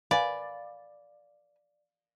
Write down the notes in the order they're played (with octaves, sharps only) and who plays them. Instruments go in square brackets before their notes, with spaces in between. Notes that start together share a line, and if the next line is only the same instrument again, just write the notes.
[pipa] B4 G#5 [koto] D5 [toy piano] F5